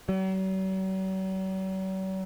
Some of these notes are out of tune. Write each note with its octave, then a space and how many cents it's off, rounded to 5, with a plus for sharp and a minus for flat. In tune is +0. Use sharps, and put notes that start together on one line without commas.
F#3 +45